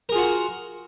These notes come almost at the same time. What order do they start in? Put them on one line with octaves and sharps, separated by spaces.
A#4 G#4 F4 F#4